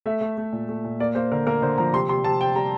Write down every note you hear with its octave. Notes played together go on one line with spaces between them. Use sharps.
A3 E5
A3
A3
A#2
A3
A#2
A#3 D5
A#3 C5
D3 A#4
A#3 A#4
D3 C5
F3 A#5
C3 C6
C3 C6
C3 A5
C3 G5
G3 A#5